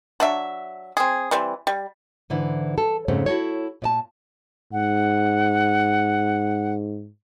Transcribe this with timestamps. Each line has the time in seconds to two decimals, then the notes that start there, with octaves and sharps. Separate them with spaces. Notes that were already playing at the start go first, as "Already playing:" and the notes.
0.20 F#3 D4 E5
0.97 C4 G#4
1.31 E3 G3 C4
1.67 G3
2.30 G#2 D3 E3 E4
2.78 A4
3.08 F2 G#2 C#3 A3 C4
3.26 E4 F#4 G#4 A4 C#5
3.82 A#2 D5 A5
4.73 G#2 F#5